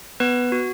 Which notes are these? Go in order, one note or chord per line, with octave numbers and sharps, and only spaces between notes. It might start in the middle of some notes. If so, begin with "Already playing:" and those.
B3 B4
F#4